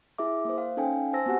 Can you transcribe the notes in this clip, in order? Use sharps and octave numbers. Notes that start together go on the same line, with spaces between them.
E4 G#4 E5 D6
A#3 C5
F5
C#4 D#4 A4 F5 G5 G#5
C5 G#5 A5 E6 A#6
B3 C4 F#4 G4 F#5 G#5